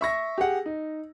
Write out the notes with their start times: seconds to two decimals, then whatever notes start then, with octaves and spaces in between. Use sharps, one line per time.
0.01 E5 C#6 A#6
0.38 G4 G#4 F#5
0.66 D#4